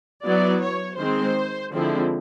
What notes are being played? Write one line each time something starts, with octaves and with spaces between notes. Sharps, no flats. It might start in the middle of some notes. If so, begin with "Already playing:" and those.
F#3 B3 E4 D5
C#5
D#3 G#3 C4 C5
D3 F3 G#3 C4 E4